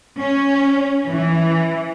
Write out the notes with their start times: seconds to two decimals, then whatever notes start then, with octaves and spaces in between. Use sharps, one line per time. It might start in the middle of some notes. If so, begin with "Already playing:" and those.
0.18 C#4
1.10 E3